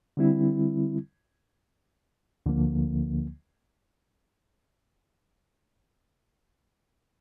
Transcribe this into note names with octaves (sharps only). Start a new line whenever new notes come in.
D3 G3 C4 E4
D2 D3 F3 A#3